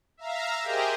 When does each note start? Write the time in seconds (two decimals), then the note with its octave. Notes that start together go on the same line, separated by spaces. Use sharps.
0.17 E5 F5 A#5
0.62 G4 G#4 A#4 C5 D#5 G5